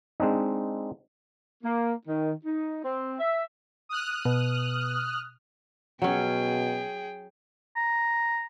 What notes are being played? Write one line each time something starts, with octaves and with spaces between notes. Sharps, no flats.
G#3 C4 D4 D#4
A#3
D#3
D#4
C4
E5
D#6 F6 F#6
B2
B2 F#3 C#4 G#4 G5
A#5